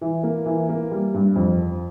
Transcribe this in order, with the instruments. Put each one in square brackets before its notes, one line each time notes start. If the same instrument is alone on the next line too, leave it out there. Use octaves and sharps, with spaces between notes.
[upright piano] E3
A#3
E3
A#3
G3
G2
F2
F3